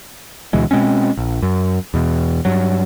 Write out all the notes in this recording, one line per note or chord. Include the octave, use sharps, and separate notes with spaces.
D2 B2 E3 G#3
B2 G#3 C4 C#4
A#1
F#2
E2 B2
G2 F#3